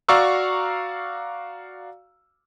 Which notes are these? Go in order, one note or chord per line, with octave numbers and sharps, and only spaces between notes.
F#4 D5 F5 A#5 C#6 E6